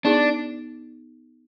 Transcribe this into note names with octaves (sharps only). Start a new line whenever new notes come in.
B3 D4 D#4 G#4